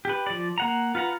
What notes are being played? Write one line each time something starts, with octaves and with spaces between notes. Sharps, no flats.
G4 B4
F3 D5
A#3 F#5 A#5
F4 B4 F#5 A#5